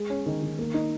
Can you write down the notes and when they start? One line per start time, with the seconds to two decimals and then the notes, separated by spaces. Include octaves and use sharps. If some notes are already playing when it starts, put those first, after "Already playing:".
Already playing: G#3
0.10 C#4
0.26 D#3
0.42 D#3
0.59 A#3
0.74 D#4